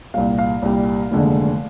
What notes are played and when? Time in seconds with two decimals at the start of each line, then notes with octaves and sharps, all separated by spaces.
0.14 C2 A#2 G3 F5
0.39 F5
0.62 C2 A#2 G3
1.11 F1 D#2 D3 G#3